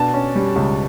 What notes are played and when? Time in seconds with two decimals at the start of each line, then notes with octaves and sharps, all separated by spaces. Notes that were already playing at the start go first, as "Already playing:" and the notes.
Already playing: B2 D4 A5
0.14 C#4
0.35 G3
0.56 C#2